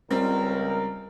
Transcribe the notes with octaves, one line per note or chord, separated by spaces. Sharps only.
C#2 G3 C4 A#4